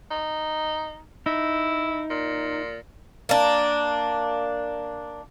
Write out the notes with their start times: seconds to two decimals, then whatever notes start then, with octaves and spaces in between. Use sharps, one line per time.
0.11 D#4
1.26 D#4 E4
2.10 A#2
3.29 A#3 D4